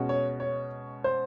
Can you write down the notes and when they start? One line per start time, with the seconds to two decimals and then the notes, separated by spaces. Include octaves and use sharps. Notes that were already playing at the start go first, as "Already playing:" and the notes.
Already playing: B2 G#3 C#4 F#4
0.09 C#5
0.40 C#5
1.04 C5